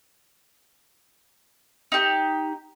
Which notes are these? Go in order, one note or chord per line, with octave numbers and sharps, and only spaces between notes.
D#4 G4